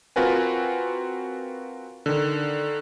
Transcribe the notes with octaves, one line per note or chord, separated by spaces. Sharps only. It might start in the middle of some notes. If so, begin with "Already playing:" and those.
C4 F4 F#4 A#4 B4 G#5
D3 D#3